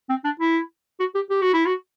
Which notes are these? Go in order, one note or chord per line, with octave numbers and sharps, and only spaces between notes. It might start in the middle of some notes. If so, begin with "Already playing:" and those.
C4
D4
E4
F#4
G4
G4
F#4
E4
F#4